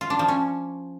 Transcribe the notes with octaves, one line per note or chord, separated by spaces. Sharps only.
F4
D4
F3
C#4